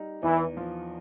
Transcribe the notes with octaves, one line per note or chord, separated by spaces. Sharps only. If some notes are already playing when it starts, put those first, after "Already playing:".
Already playing: G3 D#4
E2 E3
F3